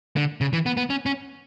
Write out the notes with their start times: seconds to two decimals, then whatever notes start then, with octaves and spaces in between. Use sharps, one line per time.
0.16 D3
0.41 C#3
0.53 E3
0.66 B3
0.77 B3
0.90 C#4
1.06 C#4